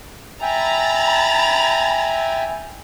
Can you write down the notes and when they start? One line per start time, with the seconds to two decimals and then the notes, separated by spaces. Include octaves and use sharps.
0.42 E5 G5 G#5 A#5 B5 A6